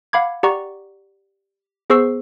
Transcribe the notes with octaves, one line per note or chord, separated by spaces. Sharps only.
F5 F#5 B5 D6 G#6
G4 D5 F#5 A#5 C#6
B3 G#4 C5 C#6 E6 C7